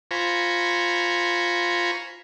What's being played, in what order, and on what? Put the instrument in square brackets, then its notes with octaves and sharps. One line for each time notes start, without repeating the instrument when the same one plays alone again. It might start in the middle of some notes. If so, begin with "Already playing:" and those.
[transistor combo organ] F4 C5 G#5 A#5 B5 C#6